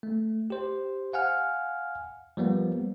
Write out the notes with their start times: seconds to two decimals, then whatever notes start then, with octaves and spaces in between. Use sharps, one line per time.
0.03 A3
0.50 G4 C5
1.13 F5 F#5 G#5 F6
2.37 F3 G3 A#3 B3